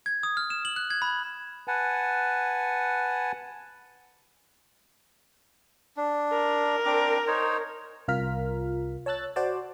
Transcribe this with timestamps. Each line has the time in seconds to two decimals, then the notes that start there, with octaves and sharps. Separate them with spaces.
0.06 G#6
0.23 D#6
0.37 F6
0.50 E7
0.65 F#7
0.76 F#6
0.90 G#6
1.02 B5
1.68 B4 F#5 G#5 A5
5.97 D4
6.32 A#4
6.85 C4 D4 D6
7.27 D#4 C5 C#5
8.08 C2 F4 A#4 F6 B6
9.06 C#5 A5 E6 F#6 A6
9.36 F#4 C5 D5 A5